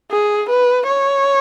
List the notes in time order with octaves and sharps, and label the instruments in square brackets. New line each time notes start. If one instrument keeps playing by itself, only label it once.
[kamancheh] G#4
B4
C#5